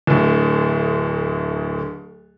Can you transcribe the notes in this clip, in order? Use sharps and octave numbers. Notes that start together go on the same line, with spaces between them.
D1 D2